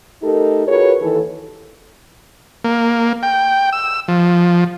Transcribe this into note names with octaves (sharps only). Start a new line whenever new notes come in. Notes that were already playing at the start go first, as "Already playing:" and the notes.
A3 D#4 G4 A4 A#4
F4 F#4 G#4 A#4 B4 C#5
D#2 E3 A4
A#3
G5
E6
F3